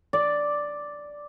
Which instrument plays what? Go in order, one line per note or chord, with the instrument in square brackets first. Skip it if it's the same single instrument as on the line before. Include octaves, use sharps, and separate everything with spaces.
[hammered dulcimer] D5